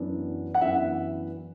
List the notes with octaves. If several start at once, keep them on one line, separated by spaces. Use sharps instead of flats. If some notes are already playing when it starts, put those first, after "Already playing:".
Already playing: F#2 E3 B3 D4
F#5
F#2 E3 B3 D4 E5